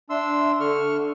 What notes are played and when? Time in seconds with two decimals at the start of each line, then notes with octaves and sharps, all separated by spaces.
0.10 D4 E5 C6 E6
0.60 D3 A4 C#6 F6